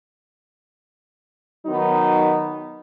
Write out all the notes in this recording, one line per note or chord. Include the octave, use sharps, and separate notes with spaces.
D#3 F#3 B3 D#4